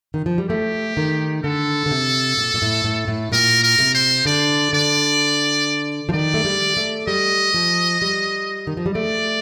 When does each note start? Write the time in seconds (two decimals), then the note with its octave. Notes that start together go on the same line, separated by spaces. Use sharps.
0.14 D#3
0.26 F3
0.38 G3
0.49 A3 G4
0.97 D#3
1.44 D3 A4
1.86 D3
1.91 C3
2.37 A#2
2.54 A#2
2.62 A2
2.84 A2
3.08 A2
3.32 A#2 A#4
3.63 A#4
3.79 C3
3.94 C5
4.25 D3 D5
4.73 D3 D5
6.09 F3
6.13 D#3 D5
6.34 A3
6.45 G3
6.77 A3
7.07 G3 D#5
7.54 F3
8.02 G3
8.67 D#3
8.77 F3
8.86 G3
8.95 A3 D5